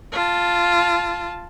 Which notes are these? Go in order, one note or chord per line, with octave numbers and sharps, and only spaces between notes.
F4 A5